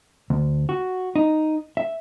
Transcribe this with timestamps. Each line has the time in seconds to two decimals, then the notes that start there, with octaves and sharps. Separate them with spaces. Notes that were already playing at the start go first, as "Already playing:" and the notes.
0.30 D2
0.69 F#4
1.16 D#4
1.77 E5